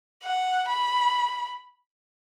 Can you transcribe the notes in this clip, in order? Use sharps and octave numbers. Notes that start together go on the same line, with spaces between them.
F#5
B5